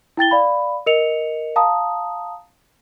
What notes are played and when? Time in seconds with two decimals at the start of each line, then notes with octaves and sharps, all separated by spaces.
0.17 E4 G5 A6 G7
0.31 D5 F5 B5
0.86 A#4 D#5 C#7 F7
1.56 F5 A5 A#5 D#6